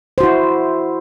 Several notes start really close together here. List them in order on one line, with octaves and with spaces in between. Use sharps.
C5 F#4 E4